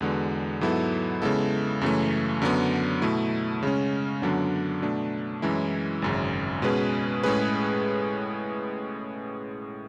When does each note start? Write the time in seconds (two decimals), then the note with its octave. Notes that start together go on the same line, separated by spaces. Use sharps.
0.01 E2 D3 G#3 B3 F#4
0.61 G#2 F#3 B3 E4 A4
1.22 C#3 G#3 B3 E4 A4
1.81 F#2 C#3 E3 A3
2.42 F#2 D3 F#3 B3
3.02 B2 A3 E4
3.63 C#3 G#3 C#4
4.22 F#2 D3 F#3 B3 D4
4.82 B2 A3 D4
5.42 F#2 E3 G#3 C#4 E4
6.02 G#1 F#2 C#3
6.62 B2 G#3 C#4 G#4 B4
7.23 A2 G#3 C#4 G#4 B4